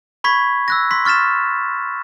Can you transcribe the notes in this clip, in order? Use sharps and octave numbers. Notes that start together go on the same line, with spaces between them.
B5 C#6 G#6 B6
E6 F#6 A#6
C6 B6
C#6 F6 A6 B6 E7